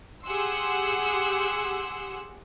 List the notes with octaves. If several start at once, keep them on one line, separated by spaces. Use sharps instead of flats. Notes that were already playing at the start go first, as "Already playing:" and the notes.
G4 G#4 F#5 C6 E6